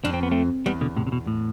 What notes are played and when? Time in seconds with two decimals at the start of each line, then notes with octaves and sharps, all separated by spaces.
0.04 F2 D4
0.14 C4
0.23 B3
0.31 A3 C4
0.66 E2 G3 B3
0.81 B2 D3
0.96 A2 C3
1.07 C3
1.12 B2
1.27 A2